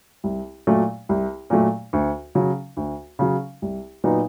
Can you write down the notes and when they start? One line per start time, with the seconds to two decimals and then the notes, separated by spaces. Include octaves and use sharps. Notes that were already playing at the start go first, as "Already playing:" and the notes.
0.24 C2
0.67 A#2 F#3 A3
1.09 C2
1.50 A#2 F#3 A3
1.93 D2
2.35 C#3 F#3
2.77 D2
3.19 C#3 F#3
3.62 C2
4.04 A#2 F#3 B3 D#4